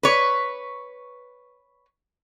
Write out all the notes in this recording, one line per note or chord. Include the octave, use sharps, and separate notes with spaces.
B4 C#5